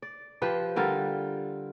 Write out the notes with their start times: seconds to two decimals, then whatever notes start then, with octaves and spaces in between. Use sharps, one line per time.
0.02 D5
0.42 F3 G4 B4 C5
0.76 D3 G3 F4 A#4